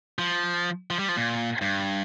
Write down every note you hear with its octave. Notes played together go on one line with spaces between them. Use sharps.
F3
F3
G3
F3
A#2
G2